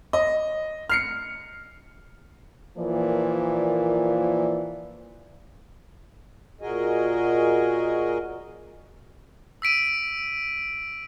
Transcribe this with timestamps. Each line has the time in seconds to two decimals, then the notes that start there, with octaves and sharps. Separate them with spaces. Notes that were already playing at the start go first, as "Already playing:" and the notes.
0.13 D#5
0.90 F6 C7 C#7
2.77 A#2 E3 F3 A#3 D5
6.61 A#2 F#4 G#4 A#4 D#5 G#5
9.62 E6 B6 D7 D#7